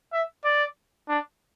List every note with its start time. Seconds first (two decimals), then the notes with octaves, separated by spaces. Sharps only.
0.12 E5
0.44 D5
1.08 D4